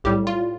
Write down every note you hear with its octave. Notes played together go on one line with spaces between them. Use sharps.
B1 A2 G3 G4
F4